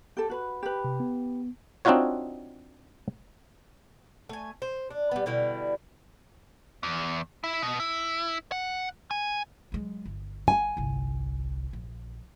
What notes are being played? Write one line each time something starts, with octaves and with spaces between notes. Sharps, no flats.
G4 A4
F#4 B4
G4 B4
C3
B3
C4 D4 D#4 F4 F#4 C#5
A3 G#5
C5
D4
G3 B3
B2 D3 G3 E4
E2
E4
B2
E4
F#5
G#5
F#3 G#3
G1
G#5
G1 C2
A#1